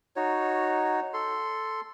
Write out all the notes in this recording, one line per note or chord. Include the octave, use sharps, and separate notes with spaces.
D#4 F#4 C#5
A4 C6